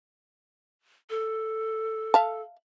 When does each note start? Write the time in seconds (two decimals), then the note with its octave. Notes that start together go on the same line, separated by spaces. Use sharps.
1.10 A4
2.14 E5 F5 A5